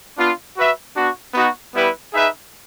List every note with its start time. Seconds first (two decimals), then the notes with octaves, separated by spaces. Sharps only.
0.16 B3 D4 F4
0.56 F#4 B4 E5
0.95 B3 D4 F#4
1.34 B3 D#4 F#4
1.74 G3 B3 E4 G4 B4
2.13 D#4 G#4 B4 E5